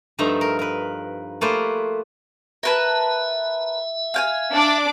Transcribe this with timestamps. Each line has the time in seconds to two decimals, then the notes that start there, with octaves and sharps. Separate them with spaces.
0.19 G2 F3 A3 D#4 E5 A#5
0.41 A#4
0.59 A#4 B4
1.41 A3 A#3 F4 G#4 B4 C5
2.63 A#4 B4 E5 A5
4.14 F5 G5 G#5
4.52 D4 D6